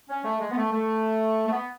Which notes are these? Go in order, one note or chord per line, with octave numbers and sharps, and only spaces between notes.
C#4
A3
G#3
B3
A3
A3
A3
B3